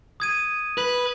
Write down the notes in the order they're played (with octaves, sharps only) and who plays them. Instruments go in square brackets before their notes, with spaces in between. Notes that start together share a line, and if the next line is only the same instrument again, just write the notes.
[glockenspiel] D#6 G#6 D#7
[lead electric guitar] B4